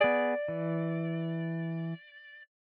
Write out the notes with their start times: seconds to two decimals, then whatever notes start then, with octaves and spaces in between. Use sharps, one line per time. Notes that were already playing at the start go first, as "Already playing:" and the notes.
0.01 B3 G#4 D5
0.48 E3